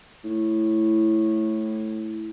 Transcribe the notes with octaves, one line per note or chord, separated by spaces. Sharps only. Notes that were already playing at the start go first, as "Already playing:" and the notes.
A2